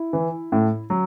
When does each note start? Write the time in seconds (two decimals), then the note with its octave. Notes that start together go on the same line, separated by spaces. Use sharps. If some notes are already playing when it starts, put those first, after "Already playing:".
Already playing: E4
0.13 E3
0.52 A2
0.90 F#3